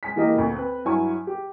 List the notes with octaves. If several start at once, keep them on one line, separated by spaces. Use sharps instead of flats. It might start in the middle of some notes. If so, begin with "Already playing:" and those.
G#3 G#5 B6
E3 G#3 A#3 G4 A#4 D#5
D2 A#2
C4 B4
G2 F#3 E4 G#5 C#6
G4